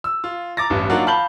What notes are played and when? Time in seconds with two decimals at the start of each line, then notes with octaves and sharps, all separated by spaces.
0.04 E6
0.24 F4
0.57 A#5 D6 A6 A#6
0.70 A1 G2
0.90 F#3 A#3 D4 D#4 F4 F#5
1.06 F5 A5 B5 G6 F#7 G7